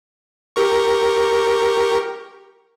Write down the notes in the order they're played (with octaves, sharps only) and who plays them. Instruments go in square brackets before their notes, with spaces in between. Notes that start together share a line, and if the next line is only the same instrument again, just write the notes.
[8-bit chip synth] G4 A#4 C#6